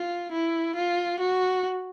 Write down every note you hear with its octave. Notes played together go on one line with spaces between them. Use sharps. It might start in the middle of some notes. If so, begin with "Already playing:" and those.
Already playing: F4
E4
F4
F#4